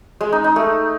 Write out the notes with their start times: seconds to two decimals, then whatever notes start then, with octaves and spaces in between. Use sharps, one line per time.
0.21 G#3
0.32 D#4
0.44 D#4
0.56 A3